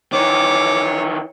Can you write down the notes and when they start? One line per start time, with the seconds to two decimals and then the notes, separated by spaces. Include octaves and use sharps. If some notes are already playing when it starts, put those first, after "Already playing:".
0.13 D#3 E3 C#5 D6